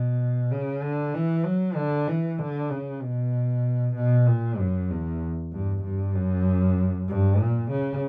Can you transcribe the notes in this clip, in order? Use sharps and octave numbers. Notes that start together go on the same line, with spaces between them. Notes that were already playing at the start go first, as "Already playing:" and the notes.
Already playing: B2
C#3
D3
E3
F#3
D3
E3
D3
C#3
B2
B2
A#2
F#2
E2
G2
G2
F#2
G2
A#2
C#3